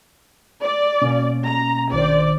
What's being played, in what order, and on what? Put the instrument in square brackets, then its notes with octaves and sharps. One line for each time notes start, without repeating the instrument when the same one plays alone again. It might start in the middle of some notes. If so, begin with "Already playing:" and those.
[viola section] D5
[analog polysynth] B2 A#3 C#4
[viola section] A#5
[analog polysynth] A#1 D#3 C5 [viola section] D5